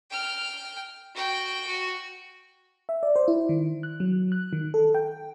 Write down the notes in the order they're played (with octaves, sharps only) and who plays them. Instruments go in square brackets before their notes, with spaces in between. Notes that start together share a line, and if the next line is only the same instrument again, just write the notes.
[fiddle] G5 F6
F#4 G5
F#4
[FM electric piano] E5
D5
C5
E4
D#3
F#6
F#3
F#6
D#3
A4
G5